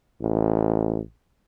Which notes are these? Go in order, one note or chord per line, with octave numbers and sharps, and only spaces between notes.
A1